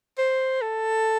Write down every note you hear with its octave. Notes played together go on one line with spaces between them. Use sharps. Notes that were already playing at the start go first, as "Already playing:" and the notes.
C5
A4